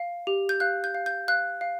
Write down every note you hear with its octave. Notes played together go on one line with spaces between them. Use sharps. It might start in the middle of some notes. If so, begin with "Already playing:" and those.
Already playing: F5
G4
G6
F5 F#6
G6
F5
G6
F5 F#6
F5